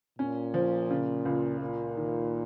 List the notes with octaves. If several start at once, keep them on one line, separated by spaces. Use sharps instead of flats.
A#2 C#4
F3
C#3
C#2
A#2 A#3
D#3